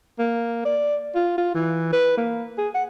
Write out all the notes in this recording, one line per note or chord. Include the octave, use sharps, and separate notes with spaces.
A#3
D5
F4
F4
E3
B4
A#3
G#4
F#5